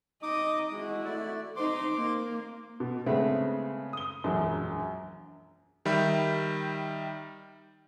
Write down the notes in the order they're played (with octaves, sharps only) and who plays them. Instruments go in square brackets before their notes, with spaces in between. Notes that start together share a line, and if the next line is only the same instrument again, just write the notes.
[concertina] D#4 D6 D#6 [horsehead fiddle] D#5
[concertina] G#3 [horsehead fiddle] E4 F#4
[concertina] A3 D5
[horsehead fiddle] D#4 C5 [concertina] C6 D6
[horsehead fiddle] A#3
[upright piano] B2
C#3 G#3 A3 B3 C4 D4
D#6 G7
E1 A#1 F#2 D4
[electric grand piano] D#3 G3 E5 B5 G6